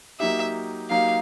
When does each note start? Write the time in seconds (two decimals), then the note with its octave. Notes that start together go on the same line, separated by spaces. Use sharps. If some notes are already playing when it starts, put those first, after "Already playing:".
0.20 F#3 A#3 D#4 G4 E5
0.90 F#3 A#3 D#4 G4 F5